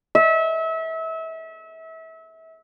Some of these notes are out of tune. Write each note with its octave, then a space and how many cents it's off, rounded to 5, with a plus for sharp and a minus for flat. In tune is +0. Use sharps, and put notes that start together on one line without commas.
E5 -30